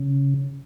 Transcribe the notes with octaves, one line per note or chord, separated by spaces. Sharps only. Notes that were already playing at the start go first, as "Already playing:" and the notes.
Already playing: C#3